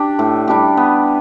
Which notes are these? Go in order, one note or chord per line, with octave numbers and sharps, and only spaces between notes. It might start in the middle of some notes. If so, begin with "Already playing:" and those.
Already playing: D4 G4
A2
G3 D4 G4
B3